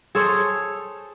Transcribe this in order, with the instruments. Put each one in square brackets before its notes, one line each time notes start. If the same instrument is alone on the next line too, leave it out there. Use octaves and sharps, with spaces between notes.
[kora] G#4 A4 C5 C#5